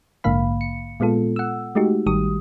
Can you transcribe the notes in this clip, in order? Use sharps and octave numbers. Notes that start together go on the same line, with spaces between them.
A#1 G#2 D3 A#3 F5 B5
C#7
A#2 G#3 B3 F4 A4
F#5 E6
G#3 A3 D#4 F#4 G4
A1 D#3 G3 G4 D#6